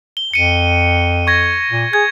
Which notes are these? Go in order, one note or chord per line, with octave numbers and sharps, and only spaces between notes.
G7
F2 C#7 D#7
C#6 G#6 A#6
A#2
G#4 G#6